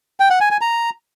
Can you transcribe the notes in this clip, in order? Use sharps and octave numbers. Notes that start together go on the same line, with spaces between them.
G5
F#5
G#5
G#5
A#5